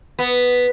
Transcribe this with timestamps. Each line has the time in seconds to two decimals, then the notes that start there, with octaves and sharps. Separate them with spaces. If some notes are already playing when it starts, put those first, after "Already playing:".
0.19 B3